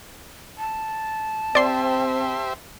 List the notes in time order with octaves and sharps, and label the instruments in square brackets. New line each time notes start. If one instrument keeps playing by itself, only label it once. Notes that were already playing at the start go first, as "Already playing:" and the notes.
[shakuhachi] A5
[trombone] C4 [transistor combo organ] G4 C5 E5 [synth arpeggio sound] D5 C6